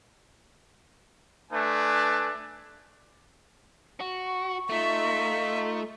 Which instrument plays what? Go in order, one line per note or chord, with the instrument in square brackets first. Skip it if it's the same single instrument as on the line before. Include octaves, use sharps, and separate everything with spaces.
[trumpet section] A3 D4 B4 G#5
[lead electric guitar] F#4 [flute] C#6
[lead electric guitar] A3 [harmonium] D#4 F4 [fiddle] E5